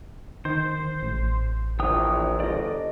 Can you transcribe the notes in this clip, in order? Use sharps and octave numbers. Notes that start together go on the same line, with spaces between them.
D#3 C5
A1
A#1 E3 G5 D#6
G1 D5 D#5